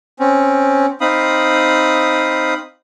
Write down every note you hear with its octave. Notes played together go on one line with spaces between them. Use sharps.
C4 C#4
C4 D#4 F5 B5 D#6